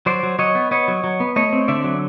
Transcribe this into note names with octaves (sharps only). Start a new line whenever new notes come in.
F#3 C5 D5
F#3
F#3 C#5 D#5
B3
B3 C#5 D#5
F#3
F#3
B3
A3 C#5 D#5
C4
D3 D5 E5
F#3